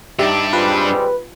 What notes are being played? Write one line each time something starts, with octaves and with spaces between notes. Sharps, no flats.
G2 D4 D#4 G4 E5
G3 G#3 C4 F4 B4